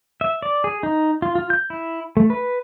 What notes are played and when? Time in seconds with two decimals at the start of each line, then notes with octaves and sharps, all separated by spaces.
0.21 E5
0.42 D5
0.64 G#4
0.83 D#4
1.22 F4
1.35 F4
1.50 G6
1.70 E4
2.17 A3
2.30 B4